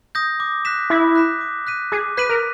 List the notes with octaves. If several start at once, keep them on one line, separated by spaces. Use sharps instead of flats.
D#6 G6 A#6
D6
F#6 B6 E7
E4 D6
F#6 B6 E7
D6
F#6 B6 D#7
G#4 D6
B4 F#6 B6 D#7
A#4